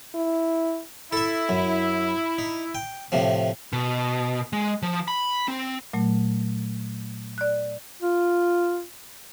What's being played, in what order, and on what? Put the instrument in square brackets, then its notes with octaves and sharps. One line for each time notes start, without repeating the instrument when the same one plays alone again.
[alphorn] E4
[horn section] E4 [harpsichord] A4 E5
[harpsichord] F#2
D#4
G5
A2 C3 F3
[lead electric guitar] B2
G#3
F3
B5
C4
[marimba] A#2 F#3 A3
D5 F#6
[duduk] F4